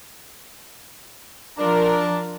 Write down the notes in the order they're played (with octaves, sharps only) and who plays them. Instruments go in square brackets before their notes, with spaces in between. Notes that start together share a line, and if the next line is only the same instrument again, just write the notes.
[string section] F3 F4 A#4 [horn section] D4